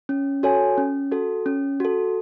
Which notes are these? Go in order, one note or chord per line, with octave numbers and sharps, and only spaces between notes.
C#4
F#4 A4 C#5 G#5
C#4
F#4 A4
C#4
F#4 A4